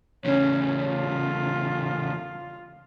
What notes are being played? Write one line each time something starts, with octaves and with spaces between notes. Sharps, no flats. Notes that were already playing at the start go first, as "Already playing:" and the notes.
E2 C#3 C#4
F4